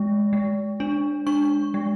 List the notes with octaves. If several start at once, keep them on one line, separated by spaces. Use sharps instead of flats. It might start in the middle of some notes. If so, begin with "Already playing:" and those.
Already playing: G#3
G#3
D4
D4 C#6
G#3